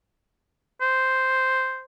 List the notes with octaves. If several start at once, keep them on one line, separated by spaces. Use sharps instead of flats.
C5